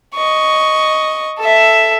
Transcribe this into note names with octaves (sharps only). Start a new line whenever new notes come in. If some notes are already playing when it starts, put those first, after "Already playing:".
D#5 C#6
A4 E5